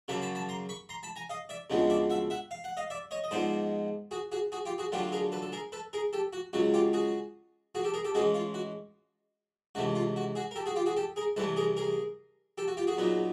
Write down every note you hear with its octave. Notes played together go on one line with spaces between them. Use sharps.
F#2 C#3 F#3 A#3 A5 B5
A5 B5
A5 B5
A#5 C6
B5 C#6
A#5 C6
A5 B5
G#5 A#5
D#5 F5
D5 E5
D2 C#3 F3 G#3 B3
D5 E5
E5 F#5
E5 F#5
F5
F#5
D#5 F5
D5 E5
C#5 D#5
D#5
G#2 F3 G#3 B3 C5 D5
F#4 G#4
F#4 G#4
F#4 G#4
F4 G4
F#4 G#4
D3 F#3 A3 D4 F4 G4
G#4 A#4
A4 B4
A4
G#4 A#4
A4 B4
G#4 A#4
G4 A4
F#4
C#2 C#3 F#3 F#4
F4 G4
F#4 G#4
F#4 G#4
G4 A4
G#4 A#4
G4 A4
A2 E3 G#3 C#4 F#4 G#4
F4
F#4
C#2 C3 E3 A3 F#4
F4
F#4
F#4 G#4
A#4
G4 A4
F#4 G#4
F4 G4
F#4 G#4
G4 A4
G#4 A#4
C2 C3 E3 A3 A4 B4
G#4 A#4
G#4 A#4
G4 A4
F#4
F4 G4
F#4 G#4
A#2 F#3 B3 D#4